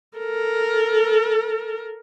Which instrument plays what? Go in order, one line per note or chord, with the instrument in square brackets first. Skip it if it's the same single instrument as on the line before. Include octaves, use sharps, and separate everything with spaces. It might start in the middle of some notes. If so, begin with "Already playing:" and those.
[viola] A4 A#4